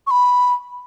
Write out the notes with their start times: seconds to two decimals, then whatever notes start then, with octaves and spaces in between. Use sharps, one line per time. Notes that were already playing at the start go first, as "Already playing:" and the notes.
0.07 C#6
0.11 B5